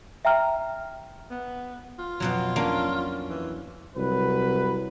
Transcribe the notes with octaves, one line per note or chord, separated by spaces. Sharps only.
E5 G5 A#5 F6
B3
F4
F2 B2 F#3
A#3 C#4 D4
E3
C2 F#3 B4